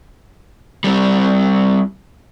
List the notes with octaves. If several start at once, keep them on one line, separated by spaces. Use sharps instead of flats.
G3 C4